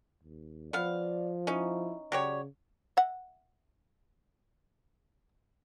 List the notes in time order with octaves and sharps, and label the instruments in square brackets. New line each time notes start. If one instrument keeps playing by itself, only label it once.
[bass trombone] D#2
[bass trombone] F3 [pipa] B3 F5 [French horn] D5
[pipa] C#4 D#4 [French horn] E4
[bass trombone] C#3 [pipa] F#3 G4 C#5 [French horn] D5
[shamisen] E5 F#5